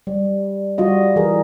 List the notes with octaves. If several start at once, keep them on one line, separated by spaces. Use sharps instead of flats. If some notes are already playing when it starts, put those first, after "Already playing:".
G3
G3 F4 F#4 D#5
E3 G#4 A#4